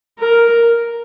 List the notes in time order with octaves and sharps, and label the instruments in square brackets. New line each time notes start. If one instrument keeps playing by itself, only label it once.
[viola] A#4